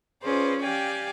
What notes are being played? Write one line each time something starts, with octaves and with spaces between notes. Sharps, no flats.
C#4 F4 G#4 B4 C5 D5
G4 D5 F5 G5 G#5